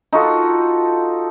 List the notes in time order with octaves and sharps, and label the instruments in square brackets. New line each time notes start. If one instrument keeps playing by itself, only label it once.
[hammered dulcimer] D#4 F4 F#4 A4